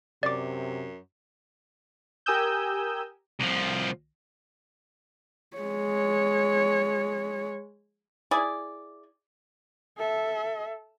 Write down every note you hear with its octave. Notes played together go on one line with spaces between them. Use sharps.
F#2 C3 D5 D6
G4 A#4 G#5 D#6 E6 G6
C2 F3
G#3 C#5
E4 G#4 D5
A4 E5